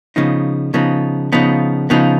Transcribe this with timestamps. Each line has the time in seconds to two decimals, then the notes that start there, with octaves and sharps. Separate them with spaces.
0.16 C#3 F3 B3 D#4
0.74 C#3 F3 B3 D#4
1.32 C#3 F3 B3 D#4
1.90 C#3 F3 B3 D#4